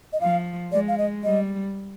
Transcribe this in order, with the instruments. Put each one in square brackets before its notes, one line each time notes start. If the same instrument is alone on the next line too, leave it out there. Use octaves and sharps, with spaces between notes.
[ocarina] D#5
[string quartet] F3 [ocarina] F5
[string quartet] G#3 [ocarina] D5
[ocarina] F5
D#5
[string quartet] G3 [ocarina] D#5